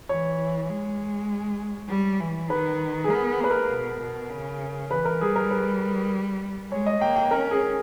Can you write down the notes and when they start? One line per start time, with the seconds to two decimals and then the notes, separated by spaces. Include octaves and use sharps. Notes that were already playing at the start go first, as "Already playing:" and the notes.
0.09 E3 C#5
0.69 G#3
1.89 G3
2.21 E3
2.50 D#3 B4
3.04 G#4
3.10 B3 A#4
3.40 A#3 B4
3.51 A#4
3.71 B2
4.01 B2
4.30 C#3
4.90 E3 B4
5.05 A#4
5.21 G3 G#4
5.36 A#4
5.51 B4
6.71 G#3 C#5
6.86 D#5
7.01 A#3 G5
7.16 G5
7.31 C#4 A#4
7.51 G#4